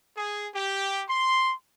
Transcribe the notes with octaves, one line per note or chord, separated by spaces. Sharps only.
G#4
G4
C6